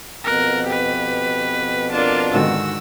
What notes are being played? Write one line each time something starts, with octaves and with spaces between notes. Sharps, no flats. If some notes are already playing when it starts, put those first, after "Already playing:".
F2 B2 A#4 F#6
G4 B4
D4 F4 A#4 D5 A5
G#2 D3 D#3 F#4 E6